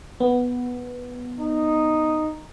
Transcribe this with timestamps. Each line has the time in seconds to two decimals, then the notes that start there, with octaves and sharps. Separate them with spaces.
0.20 B3
1.39 D#4